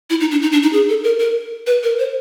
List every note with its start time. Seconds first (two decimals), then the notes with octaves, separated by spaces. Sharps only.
0.10 E4
0.20 D#4
0.31 D4
0.42 D#4
0.52 D4
0.63 D#4
0.73 G#4
0.89 A4
1.04 A#4
1.20 A#4
1.67 B4
1.83 A#4
1.99 C5